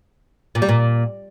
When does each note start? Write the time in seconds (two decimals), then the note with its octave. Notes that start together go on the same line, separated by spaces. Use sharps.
0.55 A#2
0.62 G3
0.69 A#2